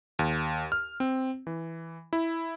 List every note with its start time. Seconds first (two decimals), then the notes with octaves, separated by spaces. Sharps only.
0.19 D#2
0.72 F6
1.00 C4
1.47 E3
2.13 E4